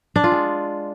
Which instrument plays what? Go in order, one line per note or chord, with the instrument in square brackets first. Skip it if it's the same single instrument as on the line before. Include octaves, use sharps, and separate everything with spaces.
[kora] D4
F4
G#3